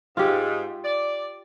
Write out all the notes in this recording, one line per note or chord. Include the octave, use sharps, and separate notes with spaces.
G#2 F4 G4
D5